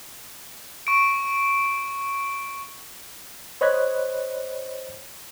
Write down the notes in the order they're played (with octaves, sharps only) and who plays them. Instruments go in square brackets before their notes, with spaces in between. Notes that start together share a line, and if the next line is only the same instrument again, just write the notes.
[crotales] C#6 D7
[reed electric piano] C5 C#5 D#5 B5 F#6 G#6